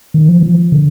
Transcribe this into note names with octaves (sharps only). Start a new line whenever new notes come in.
D#3
F3
F3
D3